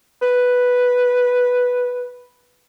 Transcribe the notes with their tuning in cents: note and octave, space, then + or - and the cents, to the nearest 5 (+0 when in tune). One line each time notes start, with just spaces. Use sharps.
B4 +0